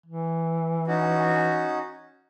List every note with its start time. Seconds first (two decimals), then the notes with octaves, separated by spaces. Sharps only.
0.06 E3
0.87 C#4 D#4 F#4